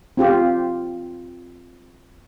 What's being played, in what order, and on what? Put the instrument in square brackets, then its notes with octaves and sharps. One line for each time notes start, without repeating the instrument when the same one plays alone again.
[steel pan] C4 F4 G4